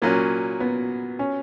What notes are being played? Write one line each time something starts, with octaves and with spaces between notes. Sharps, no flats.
A#2 F#3 A#3 C#4
B3
C#4